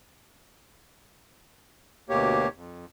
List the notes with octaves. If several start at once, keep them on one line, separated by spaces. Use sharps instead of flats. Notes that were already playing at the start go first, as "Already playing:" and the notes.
D2 B2 A#3 G4 C#5
F2